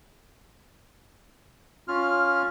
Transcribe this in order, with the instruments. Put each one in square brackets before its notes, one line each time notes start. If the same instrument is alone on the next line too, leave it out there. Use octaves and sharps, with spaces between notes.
[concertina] C#4 F4 F6